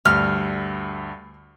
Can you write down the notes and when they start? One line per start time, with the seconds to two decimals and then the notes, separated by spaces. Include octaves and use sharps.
0.05 D2 G2 F6